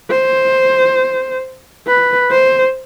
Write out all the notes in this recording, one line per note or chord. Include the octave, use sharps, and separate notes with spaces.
C5
B4
C5